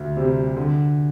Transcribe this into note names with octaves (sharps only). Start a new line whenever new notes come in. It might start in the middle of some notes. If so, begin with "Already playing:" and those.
Already playing: D2
C3 G3
D3